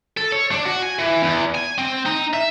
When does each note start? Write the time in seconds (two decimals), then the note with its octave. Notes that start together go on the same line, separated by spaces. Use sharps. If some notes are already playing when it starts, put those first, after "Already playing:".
0.17 A4
0.32 C#5
0.51 D4
0.66 F#4
0.83 G#5
0.99 E3
1.23 E2
1.54 G#5
1.78 C4
2.06 D#4
2.33 E5